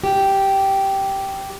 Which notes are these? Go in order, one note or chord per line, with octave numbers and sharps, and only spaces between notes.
G4